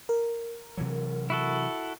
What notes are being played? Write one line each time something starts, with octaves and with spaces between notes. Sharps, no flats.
A#4
C3 E3 F#3
E4 F#4 A4